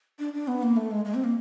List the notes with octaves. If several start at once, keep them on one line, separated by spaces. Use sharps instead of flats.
D4
D4
B3
A#3
A3
G#3
G#3
C4
A#3